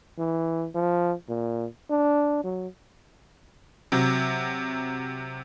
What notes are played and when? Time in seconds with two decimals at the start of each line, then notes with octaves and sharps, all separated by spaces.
0.19 E3
0.75 F3
1.29 A#2
1.90 D4
2.44 F#3
3.92 C3 F#3